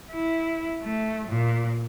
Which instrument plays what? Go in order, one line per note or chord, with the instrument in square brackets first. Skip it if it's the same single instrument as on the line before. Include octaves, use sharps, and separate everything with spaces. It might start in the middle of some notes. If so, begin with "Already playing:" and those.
[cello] E4
A3
A#2